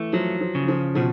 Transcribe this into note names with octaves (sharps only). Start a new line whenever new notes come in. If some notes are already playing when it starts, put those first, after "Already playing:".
Already playing: E3 A3
F3 F#3
F3
C#3
F3
B2 F3